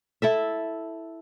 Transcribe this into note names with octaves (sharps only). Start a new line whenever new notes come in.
E4 A4 E5